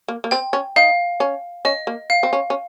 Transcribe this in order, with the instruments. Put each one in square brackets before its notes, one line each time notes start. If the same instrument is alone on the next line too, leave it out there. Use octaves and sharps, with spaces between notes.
[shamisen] A#3
A#3
[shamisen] C4 [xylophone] G5
[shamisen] C#4
[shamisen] D#4 [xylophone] F5
[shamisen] C#4
[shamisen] C#4 [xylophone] D#5
[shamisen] A#3
[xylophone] F5
[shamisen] C4
C#4
C#4